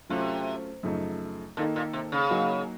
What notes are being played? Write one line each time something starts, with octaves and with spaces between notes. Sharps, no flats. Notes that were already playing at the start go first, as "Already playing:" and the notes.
C3 F#3 A3 C#4 F4
F#2 C#3 F3 A3 D#4
A#2 D#3 A#3 D#4 A4
A#2
C3
C#3
F#3 A#3 D#4 F#4